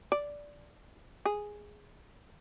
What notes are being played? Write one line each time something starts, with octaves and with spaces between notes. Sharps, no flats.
D5
G#4